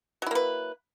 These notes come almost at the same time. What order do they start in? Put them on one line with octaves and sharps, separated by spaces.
F#3 E4 A#3 B4